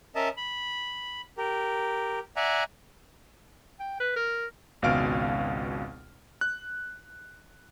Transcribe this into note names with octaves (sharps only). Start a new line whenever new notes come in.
C#4 A#4 D#5 E5 A5
B5
G4 A#4
D5 E5 F#5 G#5 A#5
G5
B4
A#4
G#1 C#2 B2 F5 F6 D7
F#6